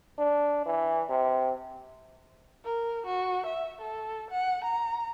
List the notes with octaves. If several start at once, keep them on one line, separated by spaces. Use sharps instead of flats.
D4
E3
C3
A#4
F#4
E5
A4
F#5
A#5